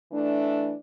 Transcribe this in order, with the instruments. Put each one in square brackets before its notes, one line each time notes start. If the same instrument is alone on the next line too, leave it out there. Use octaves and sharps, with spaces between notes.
[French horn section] E3 A3 D4